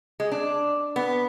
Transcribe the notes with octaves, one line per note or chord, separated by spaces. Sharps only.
G#3
D4
B3